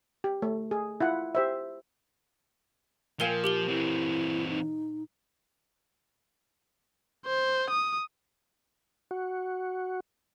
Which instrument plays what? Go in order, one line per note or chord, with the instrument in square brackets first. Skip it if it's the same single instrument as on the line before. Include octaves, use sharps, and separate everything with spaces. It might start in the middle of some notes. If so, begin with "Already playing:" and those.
[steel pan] G4
A3
G#4
E4 F4 F#5
G4 C5 E5
[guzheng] A#2 E5 G#5 [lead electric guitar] F3 [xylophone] F5 G7
[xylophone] G4 F#7 G7
[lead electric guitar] E3 C4 [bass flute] E4
[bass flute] D#4
[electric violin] C5
D#6
[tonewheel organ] F#4